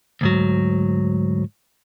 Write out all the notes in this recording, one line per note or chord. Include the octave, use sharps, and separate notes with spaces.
D2 G#2 F#3